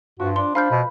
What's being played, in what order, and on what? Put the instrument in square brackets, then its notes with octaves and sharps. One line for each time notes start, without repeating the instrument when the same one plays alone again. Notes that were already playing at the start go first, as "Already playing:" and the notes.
[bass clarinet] G2 [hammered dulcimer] F3 [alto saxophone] F#4
[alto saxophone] D4 [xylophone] C6
[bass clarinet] D4 [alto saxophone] C5 [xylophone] F5 F6 G6 [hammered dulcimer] B5
[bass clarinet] B2 [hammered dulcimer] B4